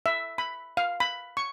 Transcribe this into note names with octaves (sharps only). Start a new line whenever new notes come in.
E5
B5
F5
B5
C#6